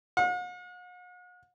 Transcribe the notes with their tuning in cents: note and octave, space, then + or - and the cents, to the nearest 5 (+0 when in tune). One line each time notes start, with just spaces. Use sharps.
F#5 -45